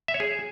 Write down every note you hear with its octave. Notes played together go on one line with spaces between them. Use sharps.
E5
C#5
G#4